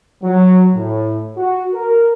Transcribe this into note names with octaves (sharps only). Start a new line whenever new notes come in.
F#3
A2
F#4
A#4